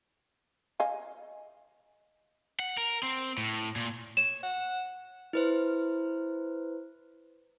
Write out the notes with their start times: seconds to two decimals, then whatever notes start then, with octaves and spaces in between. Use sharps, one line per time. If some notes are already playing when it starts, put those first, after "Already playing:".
0.80 D#5 F5 G#5
2.60 F#5
2.77 A#4
3.03 C4
3.38 A2
3.76 A#2
4.17 C#5 E7
4.43 F#5
5.33 E4 B4 C5